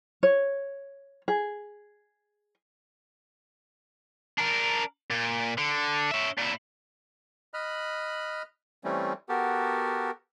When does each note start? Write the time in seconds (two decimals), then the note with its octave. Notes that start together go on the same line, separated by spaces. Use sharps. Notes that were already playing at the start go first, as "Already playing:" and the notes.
0.23 C#5
1.28 G#4
4.38 D4 A#4
5.11 A#2
5.58 D3
6.11 C#4 E5
6.38 A#2 E4
7.54 D#5 B5 F6 F#6
8.84 E3 G3 A3 C4 C#4
9.29 B3 F#4 G4 A4 A#4